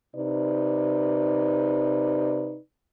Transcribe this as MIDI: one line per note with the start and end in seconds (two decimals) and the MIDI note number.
0.16 2.56 48
0.16 2.56 63
0.16 2.56 71
0.16 2.56 74